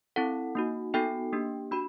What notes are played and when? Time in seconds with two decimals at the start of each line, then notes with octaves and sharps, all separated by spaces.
0.16 C4 E4 A4 F#5
0.55 A#3 D#4 F#4
0.94 B3 D#4 F#4 A4 G5
1.32 A#3 D4 G4
1.71 D4 F#4 B5